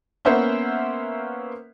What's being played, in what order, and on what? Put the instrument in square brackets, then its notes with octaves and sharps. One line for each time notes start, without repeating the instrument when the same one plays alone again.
[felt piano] A#3 B3 C#4 C5 E5 F#5